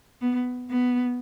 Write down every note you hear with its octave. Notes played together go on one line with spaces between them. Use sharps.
B3
B3